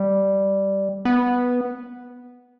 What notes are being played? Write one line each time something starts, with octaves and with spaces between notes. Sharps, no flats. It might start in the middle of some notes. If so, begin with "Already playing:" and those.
Already playing: G3
B3